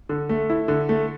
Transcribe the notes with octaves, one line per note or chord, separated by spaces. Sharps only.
D3
A3
E4
D3
A3